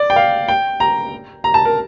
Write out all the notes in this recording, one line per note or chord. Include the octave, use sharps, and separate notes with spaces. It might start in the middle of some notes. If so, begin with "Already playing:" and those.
Already playing: D5
G5
F5
G5
A#5
A#5
A5
A#4